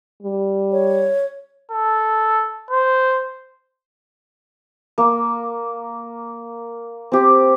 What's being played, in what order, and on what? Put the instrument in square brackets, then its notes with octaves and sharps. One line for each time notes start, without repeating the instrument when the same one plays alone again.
[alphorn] G3
[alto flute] C#5
[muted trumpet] A4
C5
[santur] A#3
C4 G4